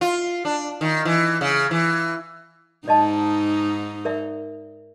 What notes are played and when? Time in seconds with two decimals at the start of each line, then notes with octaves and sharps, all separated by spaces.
0.01 F4
0.45 D4
0.81 D#3
1.05 E3
1.41 C#3
1.71 E3
2.88 G#2 D#4 D5 D#5 A5
4.05 A#4 D5 E5